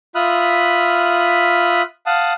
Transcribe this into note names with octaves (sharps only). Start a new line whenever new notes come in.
F4 E5 B5 D#6 F6 F#6
F5 F#5 A5 D#6